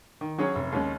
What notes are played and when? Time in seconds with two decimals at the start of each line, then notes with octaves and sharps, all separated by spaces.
0.21 D#3
0.38 F#3 C#4 G#4 C#5
0.55 F1
0.72 D#2 C#3 G#3 C#4